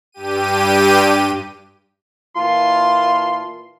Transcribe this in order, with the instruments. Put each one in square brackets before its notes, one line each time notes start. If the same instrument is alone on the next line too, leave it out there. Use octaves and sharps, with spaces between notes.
[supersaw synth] G2 G4 D#7
[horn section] A#2 E3 F4 A5 C6